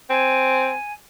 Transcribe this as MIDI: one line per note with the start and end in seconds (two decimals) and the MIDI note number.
0.10 0.73 60
0.10 0.92 80